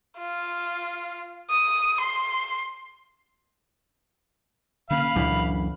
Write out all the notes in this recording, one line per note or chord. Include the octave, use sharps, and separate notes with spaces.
F4
D#6
C6
D3 A#3 C#4 F5 B5
C#2 F#2 A#2 D3 E3